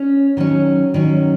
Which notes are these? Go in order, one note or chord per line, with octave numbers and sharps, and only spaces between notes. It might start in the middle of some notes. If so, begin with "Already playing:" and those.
Already playing: C#4
D#3 F#3 C#4
D#3 F#3 C#4